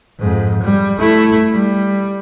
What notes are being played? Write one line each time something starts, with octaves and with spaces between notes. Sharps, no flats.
F2 G#2
G3
A3 E4
G3